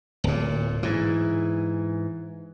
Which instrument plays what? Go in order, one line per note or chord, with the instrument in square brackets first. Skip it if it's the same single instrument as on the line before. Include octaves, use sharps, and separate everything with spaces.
[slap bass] D1 A#2
G#2 E3